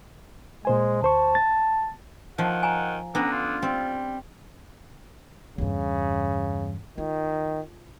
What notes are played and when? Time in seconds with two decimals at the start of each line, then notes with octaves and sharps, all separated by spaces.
0.65 A#2 G#3 C5 G#5
1.02 D2 C5 A5 C#6
1.35 A6
2.38 D#3 F3 F#5
2.63 G#5 A#5
3.15 D3 B3 C#4 D4 A#5
3.32 F4
3.62 G3 C4
5.58 E2 G2 C#3
6.98 D#3 F4